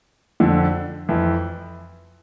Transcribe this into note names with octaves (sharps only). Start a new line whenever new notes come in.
F2 D3 F3
F2 E3